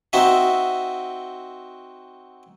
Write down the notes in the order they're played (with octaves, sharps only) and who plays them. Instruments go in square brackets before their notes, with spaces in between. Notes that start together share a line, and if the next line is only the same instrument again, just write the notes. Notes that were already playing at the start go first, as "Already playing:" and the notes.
[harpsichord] C4 D#4 F#4 E5